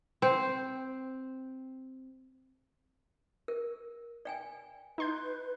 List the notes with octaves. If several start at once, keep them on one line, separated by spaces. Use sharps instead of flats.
C4 C5
A#4
D5 G5 G#5
D#4 B4 C6 G6